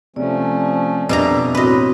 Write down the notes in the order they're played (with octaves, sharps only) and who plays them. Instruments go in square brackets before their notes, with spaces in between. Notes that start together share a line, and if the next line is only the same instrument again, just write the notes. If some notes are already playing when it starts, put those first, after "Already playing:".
[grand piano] C3 [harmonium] F3 A3 C#4 [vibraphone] D5
[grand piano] F2 G3 [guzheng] B2 D4 A#5 [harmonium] E5
[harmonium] A2 [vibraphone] C4 F#4 B5 [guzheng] B4 D#5